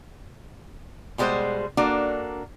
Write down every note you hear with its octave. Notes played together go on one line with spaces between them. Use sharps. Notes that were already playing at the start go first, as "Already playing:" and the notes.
B2 G3 G#3 F#4 C5
A#3 D4 F#4 A4